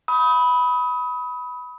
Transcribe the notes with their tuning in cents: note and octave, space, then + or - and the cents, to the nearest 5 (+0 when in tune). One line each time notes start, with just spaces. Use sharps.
B5 +0 D#6 +30